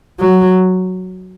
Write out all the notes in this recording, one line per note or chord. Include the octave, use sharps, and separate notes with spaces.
F#3